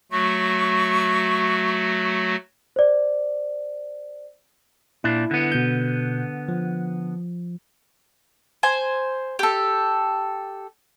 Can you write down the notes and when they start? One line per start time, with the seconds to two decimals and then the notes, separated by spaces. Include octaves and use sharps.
0.11 F#3 A3 F#4 C#6
2.76 C5 D5
5.04 A#2 D4 E4
5.31 D3 B3
5.52 B2 G6
6.48 F3
8.63 C5 G#5
9.39 G4 A4